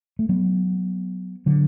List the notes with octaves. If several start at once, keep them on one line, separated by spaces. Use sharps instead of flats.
A3
F#3 B3
D3 F#3